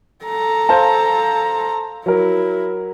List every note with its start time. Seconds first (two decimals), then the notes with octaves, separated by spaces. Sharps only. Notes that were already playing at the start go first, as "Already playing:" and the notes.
0.25 A4 A#5
0.69 C5 F5 A5
2.06 F#3 E4 A#4